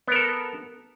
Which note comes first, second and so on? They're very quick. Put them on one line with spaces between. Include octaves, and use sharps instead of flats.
B3 A#4 A4